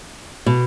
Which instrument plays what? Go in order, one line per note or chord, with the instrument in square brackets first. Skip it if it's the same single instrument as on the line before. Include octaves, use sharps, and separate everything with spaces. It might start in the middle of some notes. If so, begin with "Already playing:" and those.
[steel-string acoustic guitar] B2